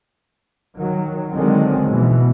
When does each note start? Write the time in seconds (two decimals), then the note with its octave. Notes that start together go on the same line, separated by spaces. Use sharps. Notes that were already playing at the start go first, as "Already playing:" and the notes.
0.78 D#3 F#3
1.32 D3 D#3 F#3 G#3 C4
1.89 B2 E3